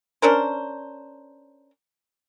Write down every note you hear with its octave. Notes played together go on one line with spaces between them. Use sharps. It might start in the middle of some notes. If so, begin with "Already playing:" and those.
C#4 D4 A#4 C5